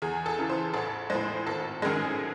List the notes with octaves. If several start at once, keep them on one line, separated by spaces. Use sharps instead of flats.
E2 G#4
A4
C#3 E3
C5
A1 A4
A2 G#3 C5
G#1 A4
F#2 D#3 G#3 G#4